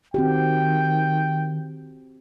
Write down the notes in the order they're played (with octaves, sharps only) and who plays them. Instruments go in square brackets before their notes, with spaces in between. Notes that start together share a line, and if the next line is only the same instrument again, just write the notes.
[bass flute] D#3 [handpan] C4 F#4 G4 [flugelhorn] G5